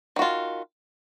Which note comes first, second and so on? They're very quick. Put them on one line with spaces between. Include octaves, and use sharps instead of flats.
D#3 F#4 F4